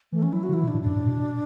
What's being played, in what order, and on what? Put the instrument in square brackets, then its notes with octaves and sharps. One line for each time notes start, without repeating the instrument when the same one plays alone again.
[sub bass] E3 [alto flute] A3
[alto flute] C#4
[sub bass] F#3 [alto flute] E4
[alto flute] F#4
[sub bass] D3
[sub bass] E3 [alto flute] E4
[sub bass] B2
[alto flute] D4
[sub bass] A2
[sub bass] F#2 [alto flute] D4
[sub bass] A2
B2
B2